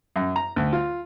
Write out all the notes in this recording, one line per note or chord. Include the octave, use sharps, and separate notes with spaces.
F#2
A#5
D2
F4